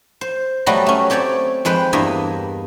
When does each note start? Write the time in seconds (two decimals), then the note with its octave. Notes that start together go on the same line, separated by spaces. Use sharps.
0.21 C5
0.66 F#3 G3 A3 B3 F#4 D#5
0.86 A3 C#4
1.10 C4 G4 C#5 D5 G5
1.65 F2 G#3 B4 C5 G5
1.93 E2 G2 A#3 D#5 E5 G#5